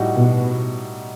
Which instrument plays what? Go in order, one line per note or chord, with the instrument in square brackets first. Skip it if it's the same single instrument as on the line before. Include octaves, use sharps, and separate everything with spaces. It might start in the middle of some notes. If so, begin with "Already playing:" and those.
Already playing: [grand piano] A2 G3 D#4 F#4
[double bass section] B2